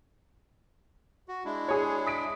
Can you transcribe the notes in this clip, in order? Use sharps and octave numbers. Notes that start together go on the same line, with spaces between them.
F#4
G#3 D4 E4
G#4 C#5
D#6 B6 D7